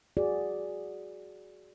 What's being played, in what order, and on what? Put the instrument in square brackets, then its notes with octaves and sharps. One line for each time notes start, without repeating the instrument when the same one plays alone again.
[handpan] F#4 G#4 D5